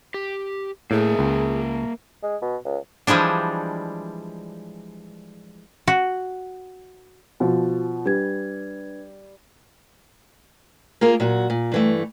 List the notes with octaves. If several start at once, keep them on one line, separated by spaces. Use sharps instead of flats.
G4
A2 A#3 G#4 A#4 E5
C#2
G#3
B2
C#2
E3 F3 G3 G#3 D4
F#4
B2 F3 F#4
G3 D4 B4 G#6
A#3 F4 G#4 A#4
A#2 F#3 F#4
A#2
G2 E3 A3